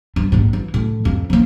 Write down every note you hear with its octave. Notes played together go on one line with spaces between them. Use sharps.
G2
A#1 G#2
E3
A2
F2
F3 A#3